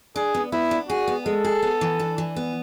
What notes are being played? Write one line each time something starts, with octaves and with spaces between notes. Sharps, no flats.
D4 G#4
B3
B3 E4
D4
F#4 G#4
B3
G#3 A4
G#4
B3
E3
D4
E3
B3